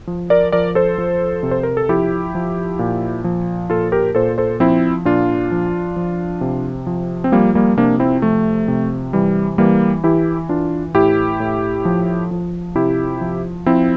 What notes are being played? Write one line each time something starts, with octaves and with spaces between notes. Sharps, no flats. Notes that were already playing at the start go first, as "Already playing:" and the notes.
F3
A#4 D5
F3 A#4 D5
A4 C5
F3
C3
C5
A#4
A4
F3 E4 G4
F3
A#2
F3
A#2 F4 A4
G4 A#4
A#2 A4 C5
A4 C5
F3 C4 E4
A#2 D4 F4
F3
F3
C3
F3
C4
F3 G3 A#3
G3 A#3
C3 A#3 D4
C4 E4
F3 A3
C3
E3 G3
E3 G3 A#3
E3 E4 G4
E3 D4 F4
A2 E4 G4
A2
F3
F3
C3 E4 G4
F3
F3 C4 E4